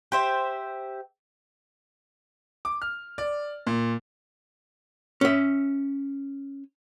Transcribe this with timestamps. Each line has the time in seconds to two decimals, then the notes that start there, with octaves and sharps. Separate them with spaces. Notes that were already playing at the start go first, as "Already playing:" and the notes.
0.12 G4 C5 E5
2.65 D6
2.82 F6
3.18 D5
3.67 A#2
5.21 C#4 E5